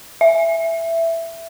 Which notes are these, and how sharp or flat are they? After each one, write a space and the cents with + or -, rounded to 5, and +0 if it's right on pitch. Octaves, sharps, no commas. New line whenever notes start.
E5 +10